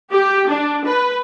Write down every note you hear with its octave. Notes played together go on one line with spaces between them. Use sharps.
G4
D4
B4